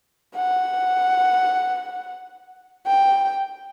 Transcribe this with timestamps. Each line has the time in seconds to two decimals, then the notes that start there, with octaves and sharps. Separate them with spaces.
0.36 F#5
2.86 G5